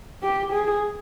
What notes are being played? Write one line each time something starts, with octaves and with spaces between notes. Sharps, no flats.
G4
G#4